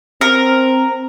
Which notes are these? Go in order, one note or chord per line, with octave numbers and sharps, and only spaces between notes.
C4 A#4